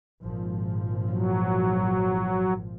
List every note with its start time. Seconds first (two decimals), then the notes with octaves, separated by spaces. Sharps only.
0.23 G#1 A#2 F3
1.10 F#3